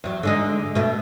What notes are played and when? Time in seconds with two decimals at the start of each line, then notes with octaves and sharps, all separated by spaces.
0.04 E2 F#3
0.23 D3 G#3 D#4
0.75 B2 A3